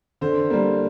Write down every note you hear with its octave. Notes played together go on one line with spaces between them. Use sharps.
D3 C5
G3 A#3